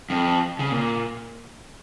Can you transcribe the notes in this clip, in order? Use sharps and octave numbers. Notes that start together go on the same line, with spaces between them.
F2
C#3
A#2